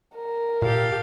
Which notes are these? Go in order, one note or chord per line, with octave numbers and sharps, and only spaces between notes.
A#4
A#2 G4 A4 F5